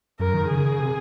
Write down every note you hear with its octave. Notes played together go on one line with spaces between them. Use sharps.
F#2 A#4
D#3
C#3 G#4
C#3
C3